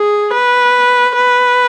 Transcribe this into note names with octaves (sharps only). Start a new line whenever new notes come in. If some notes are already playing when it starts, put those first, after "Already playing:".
Already playing: G#4
B4
B4